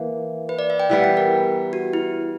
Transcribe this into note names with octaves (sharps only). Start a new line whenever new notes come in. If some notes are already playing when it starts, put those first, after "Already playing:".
Already playing: E3 A#3
B4
D5
E5
G5
E3 G3 B3 F#5
G5
A#4
F#4
E4